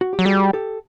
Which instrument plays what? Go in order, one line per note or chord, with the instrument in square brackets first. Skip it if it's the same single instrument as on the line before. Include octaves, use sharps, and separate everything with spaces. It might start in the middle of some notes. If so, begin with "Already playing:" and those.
[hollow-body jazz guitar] F#4
G4
[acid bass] F#3
[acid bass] G3 [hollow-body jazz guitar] F#4 G#4
[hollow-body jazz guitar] G4 A4